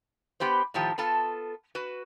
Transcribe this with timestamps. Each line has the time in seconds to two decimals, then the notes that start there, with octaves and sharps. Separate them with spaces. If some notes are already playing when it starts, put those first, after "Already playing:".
0.40 B3 G4 B4 C5
0.74 A2 D#3 F3 G4 A5
0.98 B3 F4 A4 A5
1.75 F#4 B4